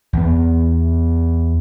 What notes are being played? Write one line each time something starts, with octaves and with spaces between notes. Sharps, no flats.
E2 B3